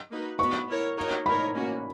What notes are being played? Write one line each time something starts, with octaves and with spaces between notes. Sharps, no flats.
A#3 D#4 F#4 B4
B3 F#4 B4 C#6
B3 E4 A#4 C#5
A#3 D#4 F#4 A#4 C#5
B3 D#4 A#4 C#5 B5
A#3 C#4 F#4